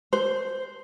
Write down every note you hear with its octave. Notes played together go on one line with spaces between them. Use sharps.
C5